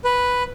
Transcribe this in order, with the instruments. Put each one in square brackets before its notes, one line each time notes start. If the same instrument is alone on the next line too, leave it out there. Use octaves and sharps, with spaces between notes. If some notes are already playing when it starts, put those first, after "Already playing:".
[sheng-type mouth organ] B4